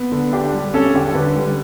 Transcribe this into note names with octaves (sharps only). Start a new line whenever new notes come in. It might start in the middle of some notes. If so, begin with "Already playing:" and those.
Already playing: B3
D3
D4 G4
G3
C#4 A4
D3 G4
A4
D3 B4
G3